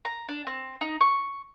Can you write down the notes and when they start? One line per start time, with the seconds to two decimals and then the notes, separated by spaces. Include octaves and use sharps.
0.05 A#5
0.29 D4
0.47 C4
0.81 D#4
1.01 C#6